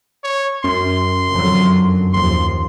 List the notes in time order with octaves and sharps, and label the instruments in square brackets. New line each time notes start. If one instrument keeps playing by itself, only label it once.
[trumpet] C#5
[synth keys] F#2 [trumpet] C6
[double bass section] F2 D3 F#3
[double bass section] D#2 F3 [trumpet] C6